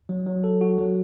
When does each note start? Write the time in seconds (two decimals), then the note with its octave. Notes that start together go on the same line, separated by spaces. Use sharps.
0.09 F#3
0.26 F#3
0.44 A4
0.61 F#4
0.78 F#3